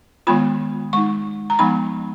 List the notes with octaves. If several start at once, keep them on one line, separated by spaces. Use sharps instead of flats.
D#3 G#3 B3 F4 B5
G#3 D#4 C#6
A#5
F3 G#3 B3 D#4 B5